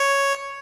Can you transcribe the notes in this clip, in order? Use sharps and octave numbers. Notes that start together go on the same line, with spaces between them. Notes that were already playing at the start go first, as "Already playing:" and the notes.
Already playing: C#5